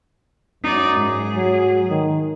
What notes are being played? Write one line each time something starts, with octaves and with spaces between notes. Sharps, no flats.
F#2 D#4 D5
G#2 G#4
F#3
D#3